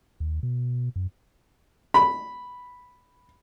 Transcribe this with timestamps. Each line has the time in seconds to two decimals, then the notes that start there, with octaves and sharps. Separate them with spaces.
0.20 D#2
0.43 B2
0.96 F#2
1.94 B5